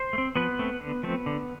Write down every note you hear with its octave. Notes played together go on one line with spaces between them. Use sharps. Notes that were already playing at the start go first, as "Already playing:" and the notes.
Already playing: C5
A3
C4
F3 B3 B4
A3 C4
D3
F3 A3 C4
D3